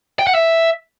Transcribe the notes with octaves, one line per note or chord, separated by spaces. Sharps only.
G5
F#5
E5